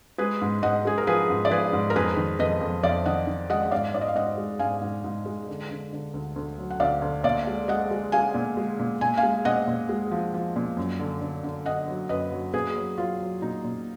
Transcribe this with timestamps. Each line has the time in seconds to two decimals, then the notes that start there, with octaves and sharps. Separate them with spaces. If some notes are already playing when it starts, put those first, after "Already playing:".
0.18 G#3 G#4 B4
0.42 G#2
0.63 G#2 D#5 F#5
0.85 G#3 G#4
0.98 A#4
1.07 F3 G#4 B4
1.30 G#2
1.45 D5
1.51 F3 G#4 B4
1.73 G#2
1.90 A#4
1.96 F2 G#4 B4
2.17 D#3
2.39 F2 B4 D#5
2.61 F2
2.83 F2 D5 F5
3.06 D#3 D#5 F#5
3.27 D#3
3.50 G#3 D#5 F#5
3.63 F#5
3.71 G#2 D5 F5
3.94 G#2 D5
4.01 D#5
4.08 F5
4.15 G#2 D#5 F#5
4.37 G#3
4.59 G#2 F5 G#5
4.81 G#2
5.04 G#2
5.26 G#3
5.49 D3
5.71 D3
5.93 D3
6.14 D2
6.36 D2
6.58 F#3
6.70 F#5
6.80 D2 D5 F5
7.02 D2
7.24 A#2 D5 F5
7.47 G#3
7.68 G#3 D#5 F#5
7.91 G#3
8.12 G#3 F5 G#5
8.34 A#2
8.57 G#3
8.79 A#2
9.01 A#2 G#5
9.17 F5 G#5
9.23 G#3
9.45 A#2 D#5 F#5
9.67 A#2
9.89 G#3
10.11 F3
10.34 F3
10.56 A#2
10.77 F#2
11.00 D3
11.21 D3
11.44 D3
11.65 D3 D#5 F#5
11.88 F#3
12.09 F#2 B4 D#5
12.32 F#3
12.53 A#2 G#4 B4
12.76 F#3
12.98 F#3 F4
13.21 F#3
13.42 A#2 D#4
13.64 A#2